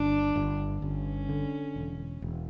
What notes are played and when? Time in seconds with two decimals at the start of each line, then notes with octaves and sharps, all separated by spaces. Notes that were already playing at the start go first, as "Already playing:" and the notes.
Already playing: G1 D4
0.36 G1
0.82 G1 C#4
1.29 D3
1.76 E1
2.22 E1